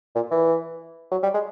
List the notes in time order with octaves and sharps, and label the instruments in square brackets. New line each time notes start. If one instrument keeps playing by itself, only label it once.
[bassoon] A#2
E3
F#3
G3
G#3